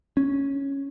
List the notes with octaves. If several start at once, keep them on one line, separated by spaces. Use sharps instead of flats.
C#4